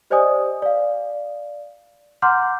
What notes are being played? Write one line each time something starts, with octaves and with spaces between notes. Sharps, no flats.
G4 C5 D5 D#5 G#5 D#6
D5 F5
F#5 A#5 C6 D6 F6 G6